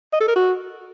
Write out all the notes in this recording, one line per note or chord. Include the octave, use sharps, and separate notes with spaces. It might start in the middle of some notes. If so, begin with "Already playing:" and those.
D#5
A4
A#4
F#4